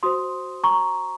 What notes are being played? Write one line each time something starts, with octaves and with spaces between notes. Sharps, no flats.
F#4 C5 C6 D#6
A#5 C#6